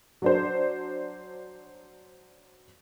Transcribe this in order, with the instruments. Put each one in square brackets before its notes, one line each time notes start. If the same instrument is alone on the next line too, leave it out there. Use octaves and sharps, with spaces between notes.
[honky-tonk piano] F#3 D4 C5